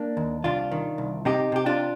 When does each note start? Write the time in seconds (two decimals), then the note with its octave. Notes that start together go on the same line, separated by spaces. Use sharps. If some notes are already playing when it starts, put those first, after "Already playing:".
Already playing: A#3 D4
0.17 D#2
0.44 C2 D4 F4
0.72 D#3
0.98 C2
1.25 C3 D#4 G4
1.52 C3 G4
1.66 D4 F4